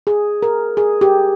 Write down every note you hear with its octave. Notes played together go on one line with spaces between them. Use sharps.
G#4
A#4
G#4
G4